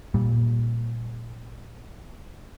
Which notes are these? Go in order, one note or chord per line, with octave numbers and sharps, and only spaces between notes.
A#2 G3